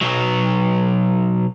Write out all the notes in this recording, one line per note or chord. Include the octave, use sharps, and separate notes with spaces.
B1 F#3